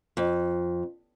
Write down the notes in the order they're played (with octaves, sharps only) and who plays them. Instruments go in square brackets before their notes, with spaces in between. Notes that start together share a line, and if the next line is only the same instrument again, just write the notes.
[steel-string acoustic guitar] F2